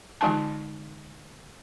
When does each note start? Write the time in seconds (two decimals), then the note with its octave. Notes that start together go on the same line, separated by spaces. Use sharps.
0.21 D3 E3 G#3 D#4 G#5 A5